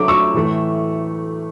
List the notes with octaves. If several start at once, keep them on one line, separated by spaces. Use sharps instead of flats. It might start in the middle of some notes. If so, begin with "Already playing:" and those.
Already playing: D2 D3 F#3 A3 D6
C#6 E6
A2 E3 A3